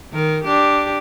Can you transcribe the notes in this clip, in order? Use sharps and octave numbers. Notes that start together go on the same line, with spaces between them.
D#3 A#4
D4 G4